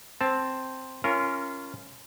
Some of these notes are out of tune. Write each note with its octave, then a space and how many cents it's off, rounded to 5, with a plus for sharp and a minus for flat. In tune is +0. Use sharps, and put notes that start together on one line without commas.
C4 +0 A5 +0
C#4 +0 F4 -30 A#4 +0